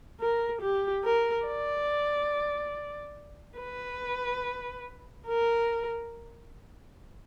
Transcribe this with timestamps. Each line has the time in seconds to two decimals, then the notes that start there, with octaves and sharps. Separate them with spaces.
0.20 A#4
0.61 G4
1.04 A#4
1.46 D5
3.58 B4
5.27 A#4